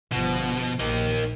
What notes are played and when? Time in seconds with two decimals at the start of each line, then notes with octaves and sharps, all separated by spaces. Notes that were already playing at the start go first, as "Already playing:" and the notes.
0.12 G1 B2 F3
0.79 A#1 A#3 D#4